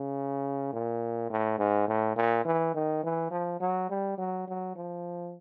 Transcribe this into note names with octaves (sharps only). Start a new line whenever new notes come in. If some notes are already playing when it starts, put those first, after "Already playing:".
Already playing: C#3
A#2
A2
G#2
A2
A#2
E3
D#3
E3
F3
F#3
G3
F#3
F#3
F3